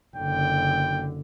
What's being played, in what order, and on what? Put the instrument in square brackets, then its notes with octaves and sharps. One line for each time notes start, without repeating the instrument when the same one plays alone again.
[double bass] F#1 D3 [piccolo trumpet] G5